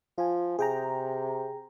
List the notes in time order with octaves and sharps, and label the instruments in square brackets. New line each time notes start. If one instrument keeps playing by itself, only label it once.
[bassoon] F3 [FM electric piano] F4 G#5
[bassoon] C3 [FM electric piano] G#4 G5 A#5